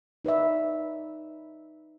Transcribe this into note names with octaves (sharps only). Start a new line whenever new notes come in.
D#4 B4 D5 E5